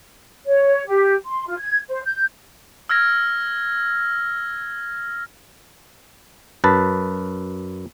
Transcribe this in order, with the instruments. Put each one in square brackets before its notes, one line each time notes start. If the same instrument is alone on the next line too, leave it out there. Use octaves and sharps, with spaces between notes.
[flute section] C#5
G4
C6
F4
G#6
C5
G6
[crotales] E6 F6 G#6 A#6
[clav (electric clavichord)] F#2 B4 A5